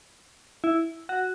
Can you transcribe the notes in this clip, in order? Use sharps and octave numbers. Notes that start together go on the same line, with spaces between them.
E4
F#4